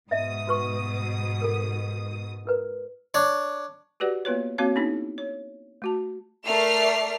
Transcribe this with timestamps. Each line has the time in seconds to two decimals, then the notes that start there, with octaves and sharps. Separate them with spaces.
0.11 G#2 B2 D#5 E5 D#6
0.47 F#4 B4 C#6
1.42 A4 A#4
2.45 E4 A#4 B4
3.14 D4 C#5
4.00 F#4 G4 B4 D5 F#5
4.25 A#3 B3 F4 B4 C#5
4.58 A#3 C4 F#4 C#5 F5
4.76 B3 C#4 D#4 E4 G#4
5.18 C#5
5.82 A3 F#4 A5
6.46 A3 A#4 D5 F6 C7